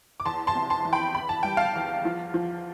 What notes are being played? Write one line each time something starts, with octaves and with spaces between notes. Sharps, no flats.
D6
E2 A5 C6
A5 C6
C3
A5 C6
E3
G5 B5
E2 B5
A5
G3 G5
F5 A5
E2
F3
F3